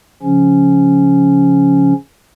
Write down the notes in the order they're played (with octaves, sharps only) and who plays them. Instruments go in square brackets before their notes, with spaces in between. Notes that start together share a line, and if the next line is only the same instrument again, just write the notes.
[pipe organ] C#3 F3 C#4